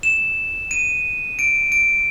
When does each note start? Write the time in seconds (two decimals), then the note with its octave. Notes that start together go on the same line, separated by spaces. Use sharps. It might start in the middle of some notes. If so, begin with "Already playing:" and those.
0.03 E7
0.71 D#7
1.39 D7
1.72 D7